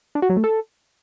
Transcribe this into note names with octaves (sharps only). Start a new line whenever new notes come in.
D4
F#4
F#3
A3
A4